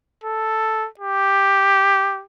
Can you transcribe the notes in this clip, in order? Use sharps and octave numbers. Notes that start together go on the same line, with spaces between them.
A4
G4